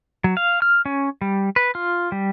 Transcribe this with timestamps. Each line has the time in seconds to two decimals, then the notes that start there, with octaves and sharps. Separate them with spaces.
0.24 F#3
0.37 F5
0.62 F6
0.86 C#4
1.21 G3
1.56 B4
1.75 F4
2.12 G3